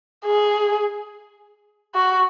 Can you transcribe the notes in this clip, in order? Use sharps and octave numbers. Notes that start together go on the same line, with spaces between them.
G#4
F#4